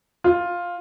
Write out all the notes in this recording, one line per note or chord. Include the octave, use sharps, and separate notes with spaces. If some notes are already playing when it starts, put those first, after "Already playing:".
F4